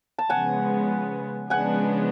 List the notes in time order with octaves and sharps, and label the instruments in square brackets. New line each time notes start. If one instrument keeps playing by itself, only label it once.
[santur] A5
[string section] C#3 F3 G#3 B3 [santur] F#5 G#5
[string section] C#3 F3 G#3 B3 D4 [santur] F#5 G#5